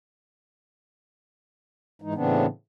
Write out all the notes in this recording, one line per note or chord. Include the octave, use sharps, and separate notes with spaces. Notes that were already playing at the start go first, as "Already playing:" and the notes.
G#2 E3 G#3 D#4
A2 C#3 E3 B3 C4 D4